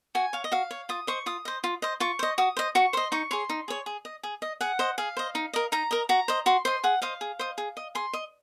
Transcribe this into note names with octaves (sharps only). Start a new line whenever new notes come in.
F#4 G#5
C#5 F5
D#5
F#4 F5
C#5
F4 D#6
C5 D#5 C#6
F4 D#6
C5 D#5
F4
C5 D#5
F4 C#6
C5 D#5
F#4 D#6
C5 D#5
F#4 C#6
C5 D#5 C6
D#4 C#6
G#4 C#5 C6
D#4
G#4 C#5
G#4
D#5
G#4
D#5
G#4 F#5
C5 D#5
G#4 F5
C5 D#5
D#4
A#4 D#5
D#4 A#5
A#4 D#5
F#4 A#5
C5 D#5
F#4 C6
C5 D#5 C6
G#4 F#5
C5 D#5 F5
G#4
C5 D#5
G#4
D#5
G#4 C6
D#5